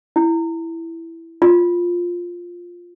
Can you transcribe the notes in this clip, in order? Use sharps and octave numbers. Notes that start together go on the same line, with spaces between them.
E4
F4